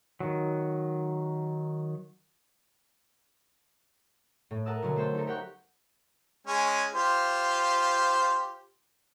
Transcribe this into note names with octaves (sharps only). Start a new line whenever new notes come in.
D#3 F#3
A2
A#4 F#5 A5 D#6 E6
B2 D3 F#3 C#4
A3 C5 G5 A5
D#4 G4 A4 A#4
G4 A#4 F#5 G5 C#6
G#3 C#4 G#5
F4 G4 C5